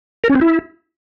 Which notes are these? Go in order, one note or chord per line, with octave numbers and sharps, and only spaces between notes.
A#4
C#4
C4
E4